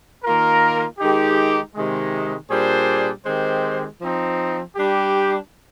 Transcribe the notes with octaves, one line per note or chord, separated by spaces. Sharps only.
D#3 A#3 F4 A#4
D#3 G#3 D#4 G4
C3 D#3 G#3
A#2 G3 D4 G#4 C5
D#3 G#3 C4 G4 C5
F3 C4 D#4
G3 D4 G4